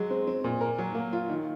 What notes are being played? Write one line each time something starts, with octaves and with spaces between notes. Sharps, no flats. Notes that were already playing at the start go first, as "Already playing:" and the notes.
Already playing: F#3 G#3
C4
C4
A#2
A#4
F#3
A#3
F4
D#3